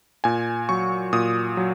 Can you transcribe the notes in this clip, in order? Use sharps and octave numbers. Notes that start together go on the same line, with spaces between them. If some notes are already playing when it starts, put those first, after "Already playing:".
A#2 G#5
F#3 C#6
A#2 D#6
F#3